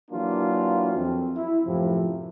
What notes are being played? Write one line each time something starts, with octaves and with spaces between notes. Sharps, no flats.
E3 F#3 A#3 D4 F4 F#4
F2 C4
E4
F#2 A2 C3 F3